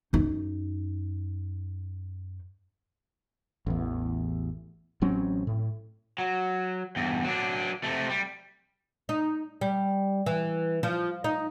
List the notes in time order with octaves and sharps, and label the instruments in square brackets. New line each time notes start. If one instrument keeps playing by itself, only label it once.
[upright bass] F#2 D#4
[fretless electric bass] A1 E2
A1 F#3 C4 C#4
A2
[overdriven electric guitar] F#3
E2 G2
F#3 D4
C3 A3
G3
[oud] D#4
G3
E3
F3
D#4